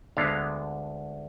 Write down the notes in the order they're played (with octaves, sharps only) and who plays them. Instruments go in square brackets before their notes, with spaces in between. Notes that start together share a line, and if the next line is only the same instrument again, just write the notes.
[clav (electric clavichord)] D2 D3 G#3 B3 F5